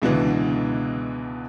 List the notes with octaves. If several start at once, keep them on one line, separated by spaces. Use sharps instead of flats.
C#2 B2 D3 E3